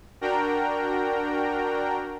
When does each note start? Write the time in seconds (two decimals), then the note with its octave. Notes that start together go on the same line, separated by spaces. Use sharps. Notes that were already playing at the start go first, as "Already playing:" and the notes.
0.21 D4 F#4 A#4 G5 A#5